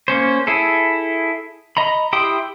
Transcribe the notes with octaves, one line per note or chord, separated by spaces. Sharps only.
A#3 C#4 C5
E4 G#4 A4
D#5 A#5 B5
E4 G4 G5 C6 D#6